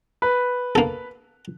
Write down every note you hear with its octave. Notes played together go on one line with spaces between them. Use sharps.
B4
A#3 A4